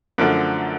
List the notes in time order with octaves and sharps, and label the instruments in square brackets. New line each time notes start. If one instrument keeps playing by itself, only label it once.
[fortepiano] F#2 D3 F3 A3